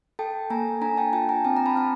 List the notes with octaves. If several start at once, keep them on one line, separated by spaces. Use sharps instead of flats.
A4 G5 A5
A#3 G#5 A#5
D4 G#5 A#5
G5 A5
F4 G5 A5
G#5 A#5
C4 G5 A5
A#5
A5 B5
C4 A5